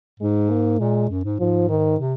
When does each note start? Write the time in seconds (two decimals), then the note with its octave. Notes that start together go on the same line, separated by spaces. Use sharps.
0.20 G#2 G#3
0.50 A#3
0.79 A#2 G#3
1.09 F#2
1.24 G#2
1.39 G#2 F3
1.69 D#3
1.99 C3